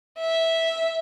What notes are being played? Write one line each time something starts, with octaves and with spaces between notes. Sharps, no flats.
E5